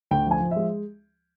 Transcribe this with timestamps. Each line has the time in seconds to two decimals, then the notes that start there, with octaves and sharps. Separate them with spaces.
0.11 D2 G5
0.26 F3 G#5
0.40 F3
0.51 G#3 E5